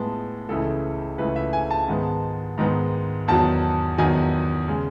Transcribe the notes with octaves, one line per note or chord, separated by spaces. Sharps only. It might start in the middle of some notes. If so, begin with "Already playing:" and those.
Already playing: A2 G#3 B3 A5
C#2 C#3 E3 A3 A4
C#2 C#3 E3 A3 B4
E5
G#5
A5
G#2 D#3 G#3 B3
G#2 D#3 G#3 B3
E2 D#3 F#3 A5
E2 D#3 F#3 G#5
C#3 G#3